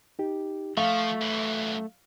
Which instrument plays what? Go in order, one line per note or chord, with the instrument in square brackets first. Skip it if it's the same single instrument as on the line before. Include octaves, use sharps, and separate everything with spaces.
[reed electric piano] D#4 G4
[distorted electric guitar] F3 [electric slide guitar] A3 [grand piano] F5 [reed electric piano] C#6
[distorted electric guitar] F#2 E3